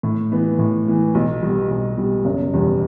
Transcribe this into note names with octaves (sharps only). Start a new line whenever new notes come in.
A2
E3 B3
A2
E3 B3
B1
B2 G3
B1
B2 G3
F#1
E2 B2 G3